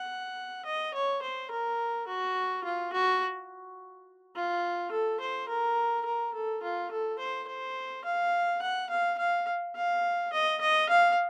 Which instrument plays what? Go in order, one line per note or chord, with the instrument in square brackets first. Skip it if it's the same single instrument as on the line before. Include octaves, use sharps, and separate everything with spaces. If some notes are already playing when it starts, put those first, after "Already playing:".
Already playing: [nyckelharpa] F#5
D#5
C#5
C5
A#4
F#4
F4
F#4
F4
A4
C5
A#4
A#4
A4
F4
A4
C5
C5
F5
F#5
F5
F5
F5
D#5
D#5
F5